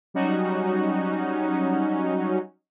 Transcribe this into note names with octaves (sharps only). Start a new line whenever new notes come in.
F#3 G3 C#4 D#4 F#4